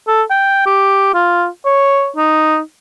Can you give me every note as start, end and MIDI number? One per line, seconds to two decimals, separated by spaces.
0.08 0.23 69
0.30 0.63 79
0.66 1.09 67
1.14 1.47 65
1.66 2.09 73
2.17 2.59 63